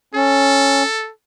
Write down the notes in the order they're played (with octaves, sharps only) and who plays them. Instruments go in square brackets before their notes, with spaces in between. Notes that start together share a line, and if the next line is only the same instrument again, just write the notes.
[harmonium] C#4 [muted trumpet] A4